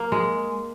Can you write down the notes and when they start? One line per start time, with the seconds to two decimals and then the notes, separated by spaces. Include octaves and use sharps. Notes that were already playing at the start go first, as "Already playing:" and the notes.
Already playing: A#3
0.12 G#3